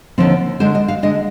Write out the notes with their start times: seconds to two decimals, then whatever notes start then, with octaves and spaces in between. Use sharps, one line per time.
0.18 D#2 D3 F3 C4
0.60 D3 G#3 D4 C5
0.75 D#5
0.88 F5
1.03 D3 G#3 D4 D#5